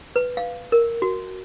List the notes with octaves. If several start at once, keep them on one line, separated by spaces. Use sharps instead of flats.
B4
F5
A#4
F#4